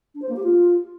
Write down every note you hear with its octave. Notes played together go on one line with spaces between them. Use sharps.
D4
C5
A#3
G4
F4